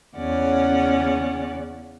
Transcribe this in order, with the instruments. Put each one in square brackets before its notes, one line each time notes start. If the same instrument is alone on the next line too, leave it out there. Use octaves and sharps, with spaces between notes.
[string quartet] E2 C#3 C#4 D5 F#5